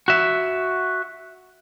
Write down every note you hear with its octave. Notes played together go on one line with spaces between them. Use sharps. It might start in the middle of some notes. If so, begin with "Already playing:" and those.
F#4 E5